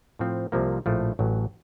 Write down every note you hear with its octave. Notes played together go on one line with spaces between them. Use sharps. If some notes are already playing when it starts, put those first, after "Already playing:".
A2 F3 C4
C2 C3 F3 A#3
A#1 A2 F3 A3
A1 A2 F#3